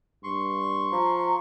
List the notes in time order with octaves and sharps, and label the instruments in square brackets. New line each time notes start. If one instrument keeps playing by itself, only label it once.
[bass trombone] G2 [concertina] C6 C#6
[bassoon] F3 [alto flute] A#5